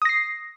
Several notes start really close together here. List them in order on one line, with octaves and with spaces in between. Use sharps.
D#6 A#6 C7